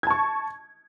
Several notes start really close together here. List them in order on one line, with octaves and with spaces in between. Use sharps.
G#6 A5 C#6